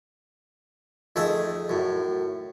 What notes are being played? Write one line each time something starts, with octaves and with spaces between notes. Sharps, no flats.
F2 D#3 A3 G#4 E5
F#2 A2